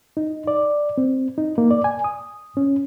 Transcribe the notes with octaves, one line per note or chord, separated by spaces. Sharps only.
D#4
D5
C4
D#4
A#3
D5
G#5
D#6
C#4